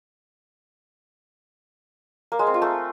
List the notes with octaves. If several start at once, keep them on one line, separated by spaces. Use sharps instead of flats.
A#3
G#3
C4
F4
A3